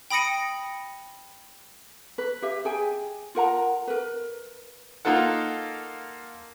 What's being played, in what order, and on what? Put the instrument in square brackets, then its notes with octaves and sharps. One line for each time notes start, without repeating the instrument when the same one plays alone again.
[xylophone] G5 B5 D#6 A#6 C#7 D#7
[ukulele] B4
G4 E5
G#4 G5 G#5
F4 A#4 F#5 A#5
A#4 B4
[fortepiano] A#3 D#4 F4 A4 F#5